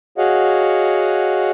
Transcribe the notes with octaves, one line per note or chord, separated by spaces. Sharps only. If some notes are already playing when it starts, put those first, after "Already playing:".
F#4 G#4 C#5 D#5 F5 F#5